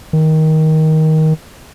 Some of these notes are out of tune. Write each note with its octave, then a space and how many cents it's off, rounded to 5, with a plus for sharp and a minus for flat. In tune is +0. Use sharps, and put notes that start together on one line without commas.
D#3 +15